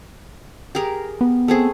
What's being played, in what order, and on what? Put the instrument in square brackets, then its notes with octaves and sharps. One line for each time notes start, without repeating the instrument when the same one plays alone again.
[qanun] G4 G#4 A#4
[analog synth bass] B3
[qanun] A3 C4 G#4